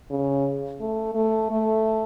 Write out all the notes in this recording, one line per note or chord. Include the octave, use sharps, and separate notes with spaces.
C#3
A3
A3
A3